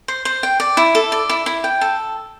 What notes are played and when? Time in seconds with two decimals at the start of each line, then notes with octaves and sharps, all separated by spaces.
0.08 C5
0.25 C5
0.43 G5
0.60 D5
0.77 E4
0.95 A4
1.12 D5
1.29 E4
1.46 E4
1.64 G5
1.81 A4